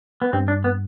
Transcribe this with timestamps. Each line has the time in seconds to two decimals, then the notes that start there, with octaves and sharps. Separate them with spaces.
0.22 B3
0.33 G2 C4
0.48 D4
0.64 B3